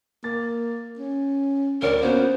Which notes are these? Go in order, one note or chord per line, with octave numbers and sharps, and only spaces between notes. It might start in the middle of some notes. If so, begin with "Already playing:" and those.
A#3 A6
C#4
D2 A#4 C#5 D5
A#3 B3 C#4 F#4 C5